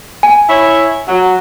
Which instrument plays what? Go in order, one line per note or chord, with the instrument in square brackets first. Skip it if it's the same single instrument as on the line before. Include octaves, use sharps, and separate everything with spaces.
[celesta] G#5
[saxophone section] E4 C#5
F#3